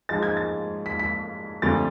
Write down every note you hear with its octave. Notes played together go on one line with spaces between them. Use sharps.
G#2 F3 G#3 A6
G#6
A6
B6
B6
D2 C3 F3 A6